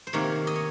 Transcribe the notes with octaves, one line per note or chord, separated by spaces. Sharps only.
C5
C3 D#3 A#3 C#5
D#5
C#5